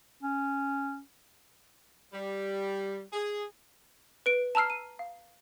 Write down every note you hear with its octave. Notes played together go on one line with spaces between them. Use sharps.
C#4
G3
G#4
B4 D7
A5 A#5 E6 F6 C7
D#7
F5